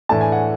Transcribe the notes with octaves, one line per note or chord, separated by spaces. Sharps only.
A2 E3 A3 D4 A5
G#5
F#5